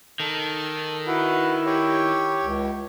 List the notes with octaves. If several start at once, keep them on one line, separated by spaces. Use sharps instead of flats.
D#3 A4
E4 F#4 B4
G4 C#5
C#2